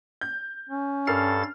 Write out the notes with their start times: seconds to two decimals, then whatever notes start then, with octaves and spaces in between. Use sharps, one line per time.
0.21 G6
0.69 C#4
1.07 G2 A4 A#4 F6 A6 C7